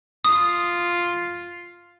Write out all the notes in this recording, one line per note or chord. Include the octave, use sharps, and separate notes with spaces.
F4 D#6